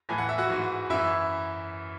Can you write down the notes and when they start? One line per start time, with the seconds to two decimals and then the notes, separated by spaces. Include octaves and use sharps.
0.09 A2 E3 G#5
0.18 F#5
0.29 E5
0.38 F#4 F#5
0.50 G#2 E3
0.90 F#2 E3 E4 E5